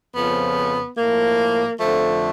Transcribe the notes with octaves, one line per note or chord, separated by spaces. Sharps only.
F2 C#3 F3 B3
A2 F3 A#3
F2 D3 F3 A3